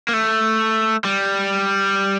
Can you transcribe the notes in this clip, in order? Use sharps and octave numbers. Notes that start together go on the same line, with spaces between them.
A#3
A3
G3